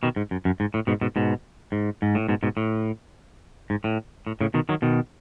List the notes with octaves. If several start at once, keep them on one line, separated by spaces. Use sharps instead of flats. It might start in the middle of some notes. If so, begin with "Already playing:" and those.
B2 D#3
G#2
F#2
F#2
G#2
A2
G#2 B2
G#2 B2
G#2 B2
G#2
G#2
A2
G#2 B2
G#2 B2
A2
G#2
A2
A2
A2 C#3
B2 D#3
D#3 F#3
B2 D#3